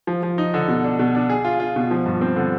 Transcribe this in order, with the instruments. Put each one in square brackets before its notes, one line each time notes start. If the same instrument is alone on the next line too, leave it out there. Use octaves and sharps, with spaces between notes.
[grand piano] F3
F3
D#4
D3
B2
D4
B2
D4
G#4
F4
F4
B2
F3
G2
C4
D3